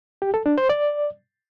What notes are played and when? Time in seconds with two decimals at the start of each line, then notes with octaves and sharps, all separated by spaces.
0.22 G4
0.34 A4
0.46 D4
0.58 C5
0.69 D5